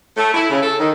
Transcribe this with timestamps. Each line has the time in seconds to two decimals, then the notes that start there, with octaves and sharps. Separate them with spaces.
0.17 A3
0.34 E4
0.50 C#3
0.62 A4
0.80 D#3